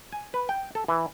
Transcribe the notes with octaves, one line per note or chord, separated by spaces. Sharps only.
G#5
B4
G5
A4
E3